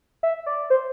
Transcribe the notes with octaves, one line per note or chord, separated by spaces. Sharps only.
E5
D5
C5